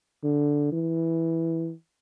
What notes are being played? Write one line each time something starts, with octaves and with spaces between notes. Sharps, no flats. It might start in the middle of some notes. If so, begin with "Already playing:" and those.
D3
E3